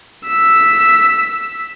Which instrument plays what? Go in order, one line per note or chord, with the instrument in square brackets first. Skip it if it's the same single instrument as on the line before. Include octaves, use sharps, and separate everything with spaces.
[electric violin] E6 B6